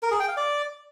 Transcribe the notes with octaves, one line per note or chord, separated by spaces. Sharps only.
A#4
G#4
G5
F5
D5